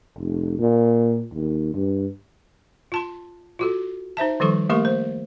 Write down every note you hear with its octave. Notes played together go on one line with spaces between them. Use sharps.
F1
A#2
D#2
G2
F4 A5 C6
F4 F#4 A4
D#4 C5 E5 A5
D#3 F3 G3 A4 C#6
A3 A#3 G4 A#4 C6 C#6
C5